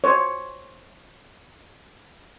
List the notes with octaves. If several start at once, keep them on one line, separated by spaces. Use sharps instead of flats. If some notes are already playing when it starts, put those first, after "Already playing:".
C5 C#5